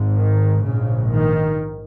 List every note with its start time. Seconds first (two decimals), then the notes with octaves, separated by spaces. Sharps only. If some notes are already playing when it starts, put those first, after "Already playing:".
Already playing: G#1 G#2
0.17 D#3
0.64 A#1 G#2 C#3
1.12 D#3